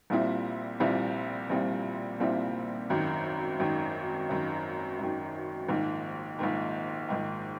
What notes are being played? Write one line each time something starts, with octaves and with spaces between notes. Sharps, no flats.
A#1 A#2 G3 C4 E4
A#1 A#2 G3 C4 E4
A#1 A#2 G3 C4 E4
A#1 A#2 G3 C4 E4
G#1 F#2 D#3
G#1 F#2 D#3
G#1 F#2 D#3
G#1 F#2 D#3
A#1 G#2 D#3
A#1 G#2 D#3
A#1 G#2 D#3